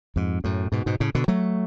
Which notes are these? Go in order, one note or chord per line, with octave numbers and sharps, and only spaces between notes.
F2 G#2
F#2 A2
G#2 B2
G#2 B2
A2 C#3
B2 D3
F#3 A3